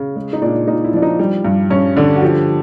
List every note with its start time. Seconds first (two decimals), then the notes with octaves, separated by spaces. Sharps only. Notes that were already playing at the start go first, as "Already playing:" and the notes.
Already playing: C#3
0.16 G#3
0.33 D#4
0.42 A#2 D4
0.67 A#2 D#4
0.85 E4
0.93 F3 D4
1.02 D#4
1.19 G3
1.45 G2
1.70 G2 C#4
1.97 D3 D4
2.16 F#4
2.22 F3 G4